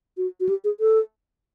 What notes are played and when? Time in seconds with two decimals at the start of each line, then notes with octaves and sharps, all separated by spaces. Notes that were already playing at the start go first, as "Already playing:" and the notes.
0.17 F#4
0.40 F#4
0.49 G4
0.64 G#4
0.80 A4